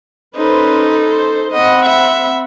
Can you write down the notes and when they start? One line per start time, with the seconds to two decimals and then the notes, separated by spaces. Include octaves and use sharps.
0.36 C#4 D#4 A4 B4 C5
1.11 C5
1.52 C4 D#5 F#5 B5
1.85 E5